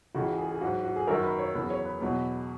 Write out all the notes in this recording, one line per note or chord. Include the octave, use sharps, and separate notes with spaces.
C#2 C#3 E3 F#4
G#4
G#4
G#2 F#3 F#4
F#4
G#4
F#2 D#3 F#3 A#4
B4
C#5
E2 C#3 F#3 B4
C#5
B4
E2 B2 F#3